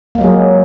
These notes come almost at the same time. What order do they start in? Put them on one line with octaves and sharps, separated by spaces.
A#3 G#3 F#3 G#4